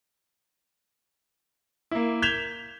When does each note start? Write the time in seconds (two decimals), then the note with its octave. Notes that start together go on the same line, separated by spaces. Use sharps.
1.91 A#3 E4
2.22 G6 G#6 B6 E7 F7 G7